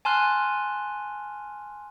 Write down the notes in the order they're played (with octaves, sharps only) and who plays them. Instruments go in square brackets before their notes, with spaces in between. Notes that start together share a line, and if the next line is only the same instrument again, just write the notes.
[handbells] G#5 A5 C6 F6 F#6